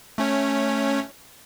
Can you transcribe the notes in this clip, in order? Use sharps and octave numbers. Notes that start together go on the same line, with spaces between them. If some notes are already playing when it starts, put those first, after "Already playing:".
A3 C#4 C#5